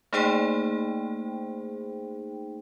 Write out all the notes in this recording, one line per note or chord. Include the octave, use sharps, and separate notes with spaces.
A3 A#3 D#4 G#4 C5 G5